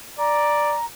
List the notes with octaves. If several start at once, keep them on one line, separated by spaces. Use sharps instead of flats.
D5 A#5